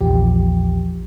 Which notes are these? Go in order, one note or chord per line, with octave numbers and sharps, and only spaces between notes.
A#1 E2 F3 G4